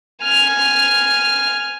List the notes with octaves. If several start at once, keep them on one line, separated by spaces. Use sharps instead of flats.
G#5 F6